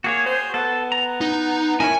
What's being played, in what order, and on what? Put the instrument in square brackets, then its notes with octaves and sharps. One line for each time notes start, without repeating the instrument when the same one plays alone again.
[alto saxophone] A#3 [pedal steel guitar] F#4 G#4 C#5
[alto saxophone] C5
[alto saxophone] B3 [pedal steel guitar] A4
[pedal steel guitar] A#5
[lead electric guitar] D#4
[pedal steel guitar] D#4 E4 C#5 [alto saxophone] A#4 [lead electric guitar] G#5